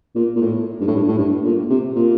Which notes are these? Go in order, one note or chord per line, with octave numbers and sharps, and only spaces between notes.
A#2
A#2
A2
G2
A2
G2
A2
G2
A#2
C3
A#2